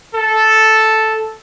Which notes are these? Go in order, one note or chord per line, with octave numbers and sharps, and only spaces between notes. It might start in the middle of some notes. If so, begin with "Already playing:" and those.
A4